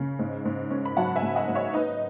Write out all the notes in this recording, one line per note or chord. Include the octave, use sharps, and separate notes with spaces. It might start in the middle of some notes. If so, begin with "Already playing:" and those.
Already playing: C#3
G#2
G#2
C#4
B5
F#3 F#5 A5
E5 G#5
G#2
D#5 F#5
G#2
C#5 E5
D#4 B4 D#5